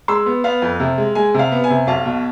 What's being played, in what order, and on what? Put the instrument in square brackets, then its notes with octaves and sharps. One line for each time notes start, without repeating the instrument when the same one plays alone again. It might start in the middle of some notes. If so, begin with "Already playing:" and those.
[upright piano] G#3 C6 E6
B3
B3 F5
F2
C3
G#3
G#3 G#5
C3 F5
B3
G#5
C3
B1 F5 A5
B2